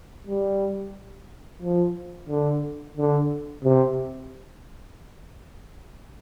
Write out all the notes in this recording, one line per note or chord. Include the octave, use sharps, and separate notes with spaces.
G3
F3
D3
D3
C3